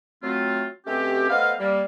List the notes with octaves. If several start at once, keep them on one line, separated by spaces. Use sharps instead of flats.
F#3 A3 C4 F4
B2 A3 C4 C#4 G4
A3 B3 C5 D#5 F5
G3 A#3